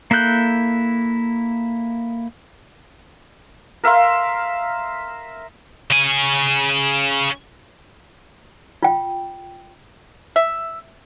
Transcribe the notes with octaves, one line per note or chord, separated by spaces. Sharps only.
A#3 E4 A4 F#6 G6
A#4 E5 F5 C6
C#3 G#5
F4 G5
E5